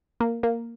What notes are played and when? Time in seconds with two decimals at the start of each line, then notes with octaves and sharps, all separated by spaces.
0.20 A#3
0.43 A#3